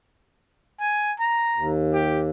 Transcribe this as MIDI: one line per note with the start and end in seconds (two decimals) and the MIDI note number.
0.80 1.14 80
1.19 1.70 82
1.55 2.30 39
1.93 2.20 67